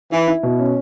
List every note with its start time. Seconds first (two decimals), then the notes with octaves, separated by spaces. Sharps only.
0.12 E3 E4
0.28 E4
0.43 B2
0.59 C#4